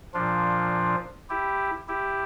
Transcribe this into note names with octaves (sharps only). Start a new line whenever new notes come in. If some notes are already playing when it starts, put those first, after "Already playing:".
A#2 F3 D4 F4
E4 G4
E4 G4